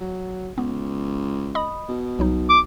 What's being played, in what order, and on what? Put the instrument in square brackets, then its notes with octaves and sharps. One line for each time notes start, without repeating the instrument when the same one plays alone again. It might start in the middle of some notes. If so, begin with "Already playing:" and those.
[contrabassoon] F#3
[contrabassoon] C#2 [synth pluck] B3
[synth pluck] D#5 B5 D#6
[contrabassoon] B2
[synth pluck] C2 F#3 D#4
[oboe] D6